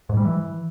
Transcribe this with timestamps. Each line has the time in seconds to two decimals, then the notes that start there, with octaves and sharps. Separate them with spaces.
0.09 G#2
0.17 G3
0.25 E3